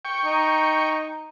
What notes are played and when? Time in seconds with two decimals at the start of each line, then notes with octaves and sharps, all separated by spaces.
0.05 G5 C#6
0.25 D#4